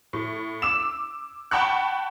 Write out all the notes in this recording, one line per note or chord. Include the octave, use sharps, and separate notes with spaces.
A2
D6 E6 E7
F#5 G5 A5 B5 C#6 F#6